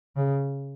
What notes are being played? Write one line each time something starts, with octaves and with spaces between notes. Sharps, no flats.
C#3